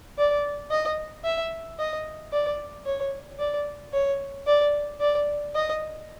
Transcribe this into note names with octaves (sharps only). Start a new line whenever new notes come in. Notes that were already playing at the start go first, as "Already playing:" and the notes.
D5
D#5
E5
D#5
D5
C#5
D5
C#5
D5
D5
D#5